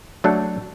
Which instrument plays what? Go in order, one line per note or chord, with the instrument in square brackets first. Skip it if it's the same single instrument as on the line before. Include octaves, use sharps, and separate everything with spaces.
[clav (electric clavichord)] F#3 A3 D4 A4